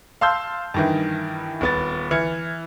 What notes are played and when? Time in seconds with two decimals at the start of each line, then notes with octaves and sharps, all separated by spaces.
0.21 F5 A5 C6 E6 G6
0.74 G2 D#3 E3
1.61 D#1 B3 A6
2.11 E3 F6 G#6 C#7